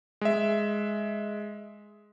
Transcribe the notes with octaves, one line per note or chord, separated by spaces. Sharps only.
G#3 E5